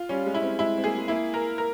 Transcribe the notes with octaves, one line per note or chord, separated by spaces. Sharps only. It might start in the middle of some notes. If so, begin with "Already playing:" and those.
Already playing: F4
G3 C#4
G#3
E4
C4
G#3 E4
C4
A#3 G#4
G#3
A#3 E4
A#4
A#4